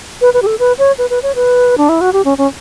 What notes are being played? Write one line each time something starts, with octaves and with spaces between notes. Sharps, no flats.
B4
B4
G4
A4
B4
C#5
B4
B4
C#5
B4
D4
E4
F#4
G4
C#4
C#4